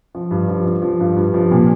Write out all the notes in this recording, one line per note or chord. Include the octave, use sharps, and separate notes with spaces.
F3
G2
F3
F3
F3
G2
G2
F3
A#2